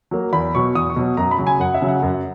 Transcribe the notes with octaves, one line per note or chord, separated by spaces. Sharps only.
F#3 A#3
E2 B5
B2 F#3 C#6
E2 D#6
C#6
B2 F#3
F#2 A#5
B5
C#3 F#3
G#5
F#2 F#5
E5
C#3 F#3
F#5
F#2